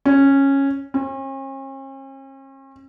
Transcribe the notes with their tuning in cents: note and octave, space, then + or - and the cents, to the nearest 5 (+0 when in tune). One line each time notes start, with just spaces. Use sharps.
C#4 -10
C#4 -45